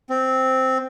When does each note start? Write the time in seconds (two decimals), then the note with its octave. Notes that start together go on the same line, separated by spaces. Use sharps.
0.10 C4